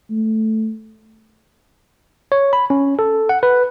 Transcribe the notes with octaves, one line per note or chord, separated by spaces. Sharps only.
A3
C#5
B5
C#4
A4
F#5
B4